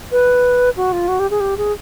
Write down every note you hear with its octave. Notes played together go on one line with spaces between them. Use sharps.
B4
F#4
F4
F#4
G4
G#4
G4
G#4